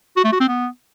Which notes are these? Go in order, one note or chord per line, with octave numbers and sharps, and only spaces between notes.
F#4
A3
F#4
C4
B3